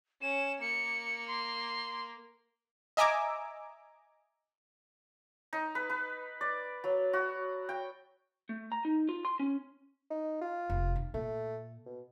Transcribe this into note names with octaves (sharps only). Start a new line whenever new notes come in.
C#4 E7
A#3 C#7
C6
D#5 E5 G#5 A#5 D6 E6
D#4
B4
B4
D5
F#3
F#4
G5
A3
A#5
D#4
F4
C6
C#4
D#4
F4
F1 A#3
D#3
A#2 A3
B2